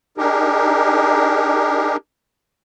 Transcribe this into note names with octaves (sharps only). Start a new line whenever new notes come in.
D4 D#4 G4 G#4 A#4